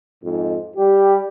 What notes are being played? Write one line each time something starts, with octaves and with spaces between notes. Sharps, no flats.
F2 G#2
G3 G4